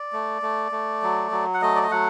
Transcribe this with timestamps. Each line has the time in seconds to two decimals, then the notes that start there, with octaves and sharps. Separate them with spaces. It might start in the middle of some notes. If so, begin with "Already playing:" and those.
Already playing: D5
0.13 A3
0.42 A3
0.72 A3
1.02 F#3
1.32 F#3
1.54 F#5
1.62 A3 D#5
1.75 D5
1.83 D#5
1.91 F#3 F#5